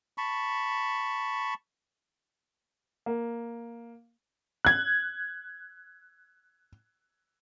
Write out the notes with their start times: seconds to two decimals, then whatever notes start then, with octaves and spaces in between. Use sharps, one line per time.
0.18 A5 B5 C#6
3.06 A#3
4.65 F#6 G#6